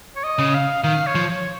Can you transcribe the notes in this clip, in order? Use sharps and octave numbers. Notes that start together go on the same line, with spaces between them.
C#5
D#5
C#3
F5
D#3 F5
C#5
F3
C#5